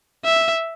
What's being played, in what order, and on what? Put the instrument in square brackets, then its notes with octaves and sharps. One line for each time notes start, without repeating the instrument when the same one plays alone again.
[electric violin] E5